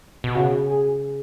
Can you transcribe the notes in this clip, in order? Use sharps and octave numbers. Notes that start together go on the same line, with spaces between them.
B2
C#3 F#4
G#4